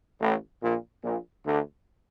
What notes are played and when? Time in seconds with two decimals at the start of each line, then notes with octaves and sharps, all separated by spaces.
0.21 A1 A2
0.62 A#1 A#2
1.04 A#1 A#2
1.45 D2 D3